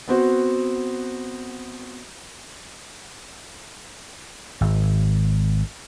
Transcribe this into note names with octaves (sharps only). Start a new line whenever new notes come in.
B3 C4 F#4
G#1